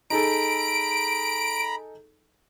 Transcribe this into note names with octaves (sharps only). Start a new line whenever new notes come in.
D#4 G#4 A4 A#5 B5 D7